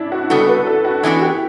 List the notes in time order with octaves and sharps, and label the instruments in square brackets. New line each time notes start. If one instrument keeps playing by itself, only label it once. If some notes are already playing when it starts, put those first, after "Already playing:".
Already playing: [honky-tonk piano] C#4 D4 E4
F#4
[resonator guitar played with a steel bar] C#3 G3 B3 F#4 [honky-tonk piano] A4
[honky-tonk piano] A4
B4
A4
F#4
[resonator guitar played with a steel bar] E3 B3 D4 F#4 [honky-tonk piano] E4
[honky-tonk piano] G4